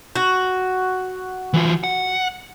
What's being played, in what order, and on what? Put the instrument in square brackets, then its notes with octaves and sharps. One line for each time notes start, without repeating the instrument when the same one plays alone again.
[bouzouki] F#4
[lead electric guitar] E3 F4
F#5